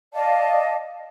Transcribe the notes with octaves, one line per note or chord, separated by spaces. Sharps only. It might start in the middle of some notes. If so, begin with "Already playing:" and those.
D5 D#5 F5 A5